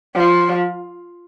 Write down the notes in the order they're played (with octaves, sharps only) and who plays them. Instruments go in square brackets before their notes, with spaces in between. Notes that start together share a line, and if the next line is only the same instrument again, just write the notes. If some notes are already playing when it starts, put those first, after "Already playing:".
[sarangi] F3